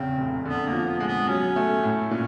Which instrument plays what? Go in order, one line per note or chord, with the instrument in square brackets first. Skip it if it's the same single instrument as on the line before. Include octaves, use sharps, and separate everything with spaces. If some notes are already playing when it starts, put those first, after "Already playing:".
Already playing: [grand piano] E2 C#3 [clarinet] C4
[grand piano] F1
[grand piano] D3 [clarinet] B3
[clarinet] A#3
[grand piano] F3
[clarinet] B3
[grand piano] G#3
[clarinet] B3
[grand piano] F#3 [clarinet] C#4
[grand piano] A3
A2
[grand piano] A#2 [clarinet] C#4